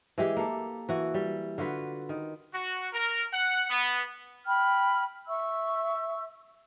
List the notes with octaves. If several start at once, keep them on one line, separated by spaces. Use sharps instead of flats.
E3 G#3 G4
A#3 A4
E3 F#4
G3
D3 F4 F#4 B4
D#3
F#4
A#4
F#5
B3
G5 B5 F6
E5 C#6 E6